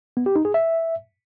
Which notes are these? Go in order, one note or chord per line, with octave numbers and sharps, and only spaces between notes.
B3
G4
D#4
G#4
E5